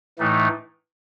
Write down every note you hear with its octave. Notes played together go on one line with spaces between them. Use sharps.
A2 E3 A3 D#4